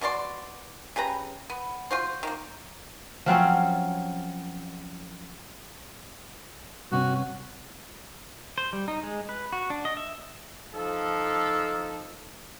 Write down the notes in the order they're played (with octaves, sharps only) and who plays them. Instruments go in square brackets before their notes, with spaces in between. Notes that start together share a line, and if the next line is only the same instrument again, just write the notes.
[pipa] B2 F#4 D5 C6
C#3 G4 B4 A#5
B3
F4 F#4 C5
D#3 A#3
[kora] F3 F#3 C4 C#4
[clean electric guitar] G2 C3 C#4 [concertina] F#4
[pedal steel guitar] C5
G3
D#4
G#3
B4
F#4
D4
D#5
E5
[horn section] F3 D#4 A4